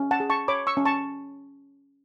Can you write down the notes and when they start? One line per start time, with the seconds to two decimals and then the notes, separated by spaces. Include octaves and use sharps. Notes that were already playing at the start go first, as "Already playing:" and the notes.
Already playing: C#4
0.11 F#5 A5
0.20 G#4
0.30 A5 C#6
0.48 C#5 B5 D6
0.67 C#6 E6
0.77 C#4
0.85 A5 C#6